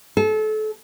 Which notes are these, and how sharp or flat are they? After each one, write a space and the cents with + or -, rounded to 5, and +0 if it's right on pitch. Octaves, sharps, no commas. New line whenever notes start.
A4 -30